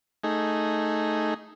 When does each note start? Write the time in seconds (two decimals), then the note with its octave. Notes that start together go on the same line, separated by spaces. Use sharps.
0.24 A3 D#4 G#4